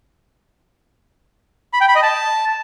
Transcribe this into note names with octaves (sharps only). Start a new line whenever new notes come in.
B5
G5
B5
D#5
A5